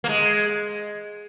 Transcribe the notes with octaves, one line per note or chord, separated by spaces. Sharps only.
A#3
G#3